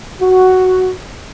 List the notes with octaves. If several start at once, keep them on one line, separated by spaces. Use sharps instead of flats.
F#4